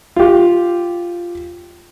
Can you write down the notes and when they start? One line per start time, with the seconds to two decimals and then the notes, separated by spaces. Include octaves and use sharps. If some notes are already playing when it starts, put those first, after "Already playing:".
0.16 F4 G4